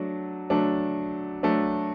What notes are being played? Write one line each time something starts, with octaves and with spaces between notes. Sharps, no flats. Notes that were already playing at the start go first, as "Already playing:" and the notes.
Already playing: F#3 A3 D4
F#3 A3 D4
F#3 A3 D4